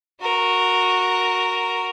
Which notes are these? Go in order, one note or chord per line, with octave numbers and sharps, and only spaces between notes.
F#4 A#4